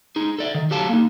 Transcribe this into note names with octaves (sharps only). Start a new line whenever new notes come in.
D#4 G#4
A4 D5 E5
D#3
F#3 G4 A4 F5 A5
A#3 D#4